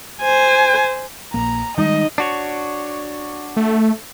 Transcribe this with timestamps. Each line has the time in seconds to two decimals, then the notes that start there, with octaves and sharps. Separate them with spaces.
0.21 C5 G#5
1.34 A#1 A#3 A#5
1.78 D#3 G3 G#3 D#4 D#5
2.18 D4 F#4 C#5
3.56 A3